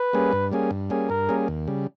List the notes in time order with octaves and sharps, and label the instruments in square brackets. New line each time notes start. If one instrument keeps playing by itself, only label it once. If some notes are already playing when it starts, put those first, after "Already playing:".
Already playing: [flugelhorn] B4
[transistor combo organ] G3 A#3 C#4 G#4
G2
G3 A#3 C#4 G#4
G2
G3 A#3 C#4 G#4
[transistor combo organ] G2 [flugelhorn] A#4
[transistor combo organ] G3 A#3 C#4 G#4
D#2
C#3 G3